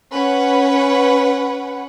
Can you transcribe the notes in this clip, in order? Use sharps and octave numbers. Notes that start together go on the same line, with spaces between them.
C#4 B4 F#5